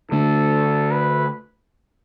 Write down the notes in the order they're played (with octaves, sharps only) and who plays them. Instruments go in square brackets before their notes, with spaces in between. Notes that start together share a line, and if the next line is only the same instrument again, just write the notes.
[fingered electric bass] D3 A3 D4 [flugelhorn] A4
[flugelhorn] B4